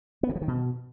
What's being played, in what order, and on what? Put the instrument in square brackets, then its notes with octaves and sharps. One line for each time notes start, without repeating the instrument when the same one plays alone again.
[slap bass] B3
D3
F3
D#3
B2